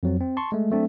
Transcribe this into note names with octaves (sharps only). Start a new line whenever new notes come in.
F2 F#3 C4
C4
A5 C6 C#6
G#3 A3
F#3 A3 C4 D4